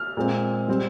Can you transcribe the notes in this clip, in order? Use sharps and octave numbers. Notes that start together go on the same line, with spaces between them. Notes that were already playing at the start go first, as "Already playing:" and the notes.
Already playing: F6
A#2 G#3 C4
G3 C4